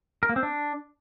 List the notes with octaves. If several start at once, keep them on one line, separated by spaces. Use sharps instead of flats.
A#4
A#3
C4
D4